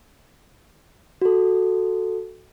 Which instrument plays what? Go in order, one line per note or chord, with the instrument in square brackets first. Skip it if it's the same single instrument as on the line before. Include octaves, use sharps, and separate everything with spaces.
[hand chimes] F#4 A4